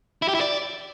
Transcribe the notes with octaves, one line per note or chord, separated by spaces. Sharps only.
E4
G4
E4
D5